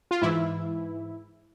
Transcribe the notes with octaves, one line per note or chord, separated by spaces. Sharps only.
F4
G#2 E3 E4